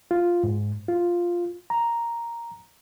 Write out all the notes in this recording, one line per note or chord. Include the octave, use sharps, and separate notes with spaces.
F4
G#2
F4
A#5